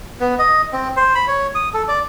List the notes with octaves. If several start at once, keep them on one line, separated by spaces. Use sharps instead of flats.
B3
D#5
C4
C5
B5
C#5
D#6
A4
D5